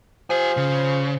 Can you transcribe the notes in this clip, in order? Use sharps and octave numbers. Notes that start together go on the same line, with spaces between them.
F3 G4 G#5
C#3